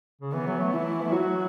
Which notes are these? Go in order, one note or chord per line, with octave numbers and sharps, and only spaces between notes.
C#3
E3 B3
F#3
A3
E3 E4
A3
F#3 F#4